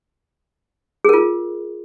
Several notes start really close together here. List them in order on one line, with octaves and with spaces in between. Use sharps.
G#4 A#4 F4